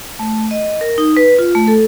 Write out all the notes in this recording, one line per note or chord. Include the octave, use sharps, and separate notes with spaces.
A3
D#5
A#4
D#4
B4
F4
A3
A4